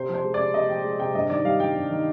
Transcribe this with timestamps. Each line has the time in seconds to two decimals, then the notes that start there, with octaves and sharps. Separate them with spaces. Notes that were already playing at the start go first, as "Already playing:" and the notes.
Already playing: C3 C5
0.09 F3
0.14 C5
0.24 G#3
0.34 C3 D5
0.54 C3 D#5
0.69 F3 G5
0.84 G#3
1.00 C3 G5
1.15 G2 D#5
1.30 D#3 D5
1.45 G3 F5
1.60 G2 G5
1.76 G2
1.90 D#3